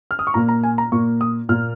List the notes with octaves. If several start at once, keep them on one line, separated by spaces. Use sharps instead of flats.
F6
D#6
C#6
A#2 A#3 A#5
A#5
G#5
A#5
A#2 A#3 C#6
D#6
A#2 A#3 F6